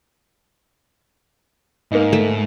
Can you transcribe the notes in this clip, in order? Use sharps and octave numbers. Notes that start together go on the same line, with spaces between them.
G#2 A#3 D#4
A3